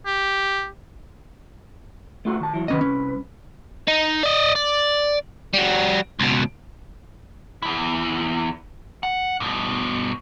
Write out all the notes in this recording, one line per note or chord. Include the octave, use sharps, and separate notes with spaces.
G4
A3 F4 F#4
D#3 A5
E3 F#3
C2 D#3 C#4 B4 D#5
C#4
D#4
D5 D#5
D5
G3 F#4
C#2 B2
E2 E4
F#5
G2 B2